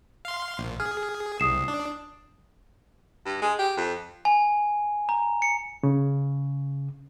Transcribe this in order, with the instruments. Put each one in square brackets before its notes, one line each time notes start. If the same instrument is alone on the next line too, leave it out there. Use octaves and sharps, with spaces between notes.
[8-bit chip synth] F5 C6
A#1
[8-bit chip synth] G#4 [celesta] F6
[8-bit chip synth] C2 [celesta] D#6 C7 E7
[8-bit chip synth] D4
[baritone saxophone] G2
G#3
G4
F2
[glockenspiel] G#5
A#5
C#7
[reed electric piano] C#3